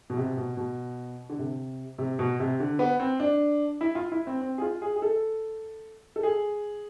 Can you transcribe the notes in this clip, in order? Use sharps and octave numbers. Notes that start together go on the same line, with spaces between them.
B2
C3
B2
B2
D3
C3
C3
B2
C3
D3
B3
C4
D4
E4
F4
E4
C4
C4
G#4
F4
G#4
G#4
A4
A4
G#4